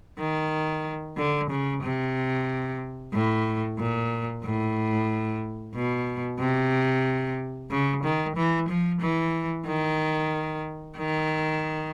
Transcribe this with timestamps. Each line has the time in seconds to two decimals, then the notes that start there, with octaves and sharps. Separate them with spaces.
0.20 D#3
1.18 D3
1.50 C#3
1.83 C3
3.14 A2
3.79 A#2
4.45 A2
5.75 B2
6.40 C3
7.71 C#3
8.04 D#3
8.36 E3
8.69 F3
9.01 E3
9.66 D#3
10.97 D#3